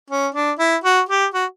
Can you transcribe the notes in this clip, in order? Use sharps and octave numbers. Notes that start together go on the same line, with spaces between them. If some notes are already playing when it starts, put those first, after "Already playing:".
C#4
D4
E4
F#4
G4
F#4